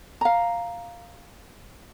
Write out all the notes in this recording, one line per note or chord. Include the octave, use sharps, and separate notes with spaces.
F5 A#5